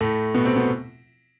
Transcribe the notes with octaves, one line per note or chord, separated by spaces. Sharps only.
A2 A3
B2 B3
C3 C4
B2 B3